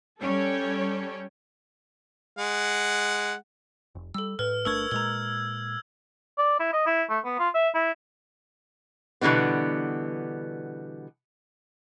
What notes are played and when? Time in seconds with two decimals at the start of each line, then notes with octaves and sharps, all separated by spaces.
0.20 G3 C#4 A4 C#5 G5
2.38 G#3 F#5
3.95 F1
4.14 G3 A4 E6
4.39 A2 B4 F6
4.65 G1 A3 D4 A#4 C#6 E6 G#6
4.91 A#2 G#3 A#5 G7
6.38 D5
6.60 E4
6.73 D#5
6.86 E4
7.10 A3
7.25 B3
7.39 F4
7.55 E5
7.75 E4
9.21 B2 D3 E3 G3 B3